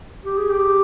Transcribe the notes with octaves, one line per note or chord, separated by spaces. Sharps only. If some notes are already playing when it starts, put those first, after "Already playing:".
G4
G#4
G4